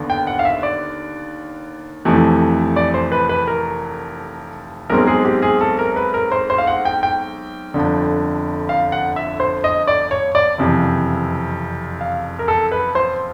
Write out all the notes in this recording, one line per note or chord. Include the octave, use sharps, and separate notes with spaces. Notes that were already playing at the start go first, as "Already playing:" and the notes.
Already playing: D#2 D3 B3
G5
F#5
F5
E5
D5
F1 F2 C3 E3 A3
D5
C5
B4
B4
A#4
B1 B2 G#3 C4 A#4
G#4
G4
G#4
A4
A#4
B4
A#4
C5
C5
F5
F#5
G5
G5
G1 F2 D3
F5
F#5
E5
C5
D#5
D5
C#5
D5
F#1 F2 C3 E3
F5
A#4
A4
B4
C5